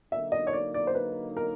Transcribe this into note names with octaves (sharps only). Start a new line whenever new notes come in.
D3 F#3 A#3 D#4 E5
D#5
C#5
D5
D5
C5
B4
A#4